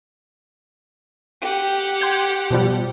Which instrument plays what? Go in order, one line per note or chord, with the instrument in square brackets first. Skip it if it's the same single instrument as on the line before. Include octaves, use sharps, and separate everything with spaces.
[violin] G4 F#5
[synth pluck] C6 G6 G#6
B2 F3 G3